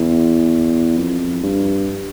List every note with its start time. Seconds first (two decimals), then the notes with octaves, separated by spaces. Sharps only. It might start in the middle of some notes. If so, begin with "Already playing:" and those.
Already playing: E2
0.98 F2
1.43 G2